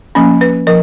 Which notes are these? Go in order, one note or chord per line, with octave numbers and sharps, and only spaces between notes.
F3 A#3 C#4
B4
F3 A#4